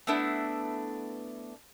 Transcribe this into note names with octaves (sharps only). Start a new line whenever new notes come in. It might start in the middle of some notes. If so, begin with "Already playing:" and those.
A3 B3 D4 E4